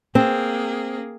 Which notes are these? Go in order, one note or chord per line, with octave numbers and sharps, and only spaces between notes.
A#3 C4 G#4